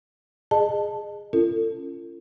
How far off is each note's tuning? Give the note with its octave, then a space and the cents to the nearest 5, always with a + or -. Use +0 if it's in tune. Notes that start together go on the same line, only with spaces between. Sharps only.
G#4 +0 D#5 -25 A5 +0
C#4 +0 F4 -40 A4 +40